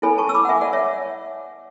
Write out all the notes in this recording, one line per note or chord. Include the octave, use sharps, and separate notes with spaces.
E4 A4 C#5 G#5 B5
A5 C#6
E6
B5 D6
F#5
E5 G#5
D5 F#5
C#5 E5